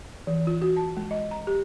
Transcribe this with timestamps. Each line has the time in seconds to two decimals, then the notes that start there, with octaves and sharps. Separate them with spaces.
0.27 E3
0.47 F4
0.62 F#4
0.77 A5
0.97 G#3
1.11 D#5
1.31 A#5
1.47 G4